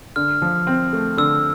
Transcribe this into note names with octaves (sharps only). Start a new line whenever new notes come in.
D3 F6
F3
C4
A3
D3 E6